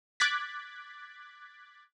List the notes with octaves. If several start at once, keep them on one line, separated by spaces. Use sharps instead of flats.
D6 F#6 G#6 A6 B6